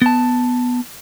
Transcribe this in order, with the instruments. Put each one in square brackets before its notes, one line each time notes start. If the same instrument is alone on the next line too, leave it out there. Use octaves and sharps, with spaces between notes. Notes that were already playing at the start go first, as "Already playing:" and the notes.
[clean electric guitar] B3 A5